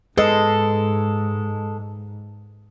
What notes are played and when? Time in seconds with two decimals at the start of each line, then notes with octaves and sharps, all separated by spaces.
0.18 G#2 G#3 A4 B4 D#5